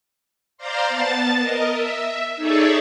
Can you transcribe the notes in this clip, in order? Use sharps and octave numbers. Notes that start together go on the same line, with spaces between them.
C5 D5 F5 A#5 C6
B3 A5 A6
A#4 D#5
E5
D#4 G#4 A4 C#5 D5 E5